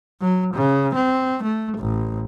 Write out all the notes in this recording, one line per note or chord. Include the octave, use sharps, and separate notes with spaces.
F#3
C#3
C4
A3
A1